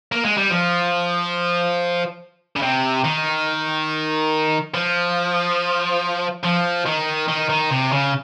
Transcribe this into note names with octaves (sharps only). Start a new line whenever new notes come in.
A#3
G#3
G3
F3
C#3
C3
D#3
F3
F3
D#3
D#3
D#3
C3
C#3